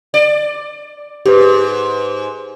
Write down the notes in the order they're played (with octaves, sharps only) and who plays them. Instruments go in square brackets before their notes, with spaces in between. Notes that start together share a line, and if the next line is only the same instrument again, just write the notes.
[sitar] D5
[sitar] G#2 [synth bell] G4 B4